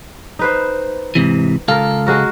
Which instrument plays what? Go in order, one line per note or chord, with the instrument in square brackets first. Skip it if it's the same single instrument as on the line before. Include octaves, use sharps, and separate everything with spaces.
[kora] D#4 B4 C5
[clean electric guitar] G#2 C3 E3
[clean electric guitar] C#2 A4 F5 [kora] F4 A#4
[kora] G#3 F#4 A#4